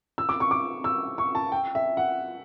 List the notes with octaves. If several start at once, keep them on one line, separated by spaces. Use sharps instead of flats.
E6
D6
C#6
D6
E6
C#6
A5
G5
E5
F#5